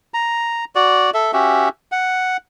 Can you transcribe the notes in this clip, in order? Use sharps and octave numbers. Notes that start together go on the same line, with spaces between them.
A#5
F#4 D5
A4 E5
C#4 F#4 G4 E5
F#5